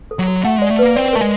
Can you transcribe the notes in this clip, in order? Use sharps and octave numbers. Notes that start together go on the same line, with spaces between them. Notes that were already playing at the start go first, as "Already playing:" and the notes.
A4
F#3
F#4
A3 F#5
G#3 D5
A3
A#3 B4
C4 D5
A3 A#4
G#3